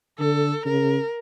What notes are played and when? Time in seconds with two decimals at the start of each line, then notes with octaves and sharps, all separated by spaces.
0.19 D3 A4
0.65 C#3 A#4